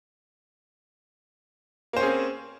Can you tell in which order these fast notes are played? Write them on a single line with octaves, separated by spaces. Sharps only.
A#3 C5 C#4 G#4 C4